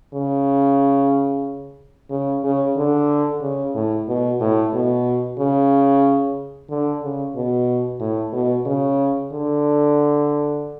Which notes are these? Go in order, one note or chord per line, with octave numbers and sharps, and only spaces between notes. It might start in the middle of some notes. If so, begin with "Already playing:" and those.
C#3
C#3
C#3
D3
C#3
A2
B2
A2
B2
C#3
D3
C#3
B2
A2
B2
C#3
D3